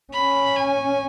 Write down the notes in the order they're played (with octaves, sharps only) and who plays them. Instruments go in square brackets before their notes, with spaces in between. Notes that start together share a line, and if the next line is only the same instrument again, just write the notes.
[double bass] C#4 [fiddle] B5
[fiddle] G#5